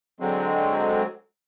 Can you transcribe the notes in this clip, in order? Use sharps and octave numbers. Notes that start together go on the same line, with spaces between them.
D3 F#3 G#3 C4